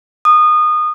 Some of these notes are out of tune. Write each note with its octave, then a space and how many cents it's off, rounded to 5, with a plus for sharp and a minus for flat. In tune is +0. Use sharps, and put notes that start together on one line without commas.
D#6 -25